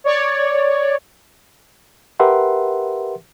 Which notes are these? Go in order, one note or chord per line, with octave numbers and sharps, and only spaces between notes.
C#5 D5
G4 A#4 B4 E5 F#5 C6